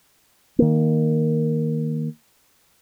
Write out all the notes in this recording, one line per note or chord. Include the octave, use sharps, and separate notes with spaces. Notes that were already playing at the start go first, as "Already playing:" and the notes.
D#3 A#3